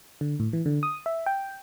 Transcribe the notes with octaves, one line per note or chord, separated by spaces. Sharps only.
D3
A2
E3
D3
D#6
E5
G5